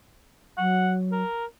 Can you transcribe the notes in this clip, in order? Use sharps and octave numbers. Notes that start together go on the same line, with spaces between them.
F#3 F#5
A#4